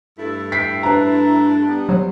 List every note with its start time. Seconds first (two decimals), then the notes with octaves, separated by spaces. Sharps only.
0.19 G2 A3 E4 A4
0.52 G5 B6 C7
0.83 D4 B4 A#5
1.67 G3 B3
1.89 F#3 C5